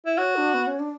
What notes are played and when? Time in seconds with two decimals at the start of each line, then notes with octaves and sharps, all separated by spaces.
0.06 E4
0.18 F#4 C#5
0.36 D4
0.54 B3
0.67 C#4
0.79 D4